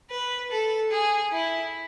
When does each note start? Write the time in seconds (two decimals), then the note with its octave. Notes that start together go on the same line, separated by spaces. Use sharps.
0.10 B4
0.51 A4
0.91 G#4
1.32 E4